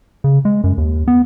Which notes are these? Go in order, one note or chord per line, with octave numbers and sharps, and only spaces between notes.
C#3
G#3
F#2
D#2
B3